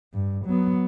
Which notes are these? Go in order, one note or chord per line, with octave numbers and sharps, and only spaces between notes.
G2
F#3 B3